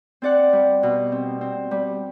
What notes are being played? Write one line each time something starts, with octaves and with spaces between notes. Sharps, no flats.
C4 D5 F#5
G3
B2
C4
C4
G3